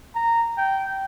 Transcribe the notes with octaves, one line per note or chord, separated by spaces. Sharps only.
A#5
G5